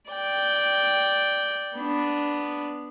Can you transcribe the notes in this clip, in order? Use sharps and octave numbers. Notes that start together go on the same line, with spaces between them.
D5 G5
B3 D4